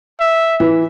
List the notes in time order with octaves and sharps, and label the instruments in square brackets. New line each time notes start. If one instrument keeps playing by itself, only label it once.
[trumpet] E5
[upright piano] E3